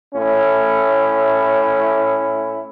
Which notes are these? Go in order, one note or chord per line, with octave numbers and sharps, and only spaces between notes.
A2 C#4 E4